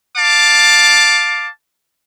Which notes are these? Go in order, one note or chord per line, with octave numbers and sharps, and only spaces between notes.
F5 A5 D6